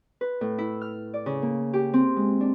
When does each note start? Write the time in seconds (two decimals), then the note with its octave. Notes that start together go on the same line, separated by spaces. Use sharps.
0.21 B4
0.41 A2
0.58 E4
0.81 F6
1.14 D5
1.26 C#3
1.42 A#3
1.73 G4
1.94 C4
2.16 G#3
2.41 D4